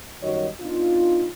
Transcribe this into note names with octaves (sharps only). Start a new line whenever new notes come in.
F#2 D#3 G3 F#4 C#5 D#5
B3 D4 D#4 F4